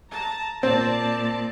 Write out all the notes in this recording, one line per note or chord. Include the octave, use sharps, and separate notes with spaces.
A5 A#5
A#2 C4 D5 A5